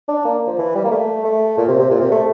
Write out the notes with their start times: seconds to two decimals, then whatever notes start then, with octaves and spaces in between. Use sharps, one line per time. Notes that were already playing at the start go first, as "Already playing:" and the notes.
0.09 D4
0.25 A#3
0.47 F3
0.58 E3
0.75 G3
0.84 A#3
0.91 A3
1.24 A3
1.57 A#2
1.68 C3
1.79 C3
1.90 A#2
2.01 C3
2.12 A3